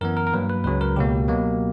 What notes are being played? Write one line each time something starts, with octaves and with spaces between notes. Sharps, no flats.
F#2 E3 B3 A#4
A#4
A#4
G2 F#3 A#3 B4
B4
C#2 C#3 F#3 B4
A#4
C#2 B2 A#3 G4
B2 F#3 A#3